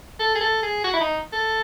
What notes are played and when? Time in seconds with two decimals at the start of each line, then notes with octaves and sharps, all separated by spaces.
0.19 A4
0.35 G#4
0.41 A4
0.62 G#4
0.84 F#4
0.93 E4
1.00 D#4
1.33 A4